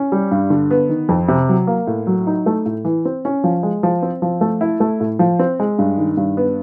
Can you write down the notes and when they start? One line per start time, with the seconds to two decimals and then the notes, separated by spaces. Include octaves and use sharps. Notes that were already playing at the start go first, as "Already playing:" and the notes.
Already playing: C#4
0.12 G3
0.31 G2
0.50 D3
0.71 B3
0.89 D#3
1.09 F2
1.28 C3
1.49 F#3
1.67 A#3
1.87 A2
2.07 F#3
2.27 D#4
2.46 A3
2.66 A2
2.85 E3
3.05 C4
3.25 C#4
3.44 F3
3.63 G#3
3.83 F3
4.03 C4
4.22 F3
4.41 A3
4.61 E4
4.80 A3
5.00 A2
5.19 F3
5.39 C4
5.60 G#3
5.79 G2
5.98 D#3
6.17 G2
6.37 B3